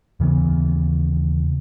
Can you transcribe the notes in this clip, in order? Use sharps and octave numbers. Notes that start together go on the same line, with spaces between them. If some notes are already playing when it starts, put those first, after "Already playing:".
D#2 C#3 E3 B3